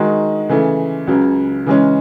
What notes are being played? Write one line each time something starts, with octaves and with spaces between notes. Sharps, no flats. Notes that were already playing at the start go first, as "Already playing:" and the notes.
Already playing: D#3 G#3 D#4 F#4
C#3 E3 A3
C#2 C#3 F#3
C#3 E3 G#3 C#4